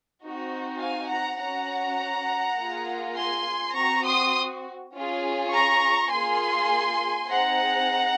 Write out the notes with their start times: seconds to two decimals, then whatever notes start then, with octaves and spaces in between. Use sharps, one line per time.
0.22 C4 D#4 F#4
0.79 F5 G#5
1.09 F#5 A#5
1.38 C#4 F#4 F#5 A#5
2.57 A#3 F4 G#4
3.16 G#5 C6
3.74 C4 F#4 A#5 C#6
4.04 C6 D#6
4.94 C#4 F4 G#4
5.53 A#5 C#6
6.11 A#3 F4 G#4 G#5 C6
7.28 C4 D#4 G#4 F#5 A#5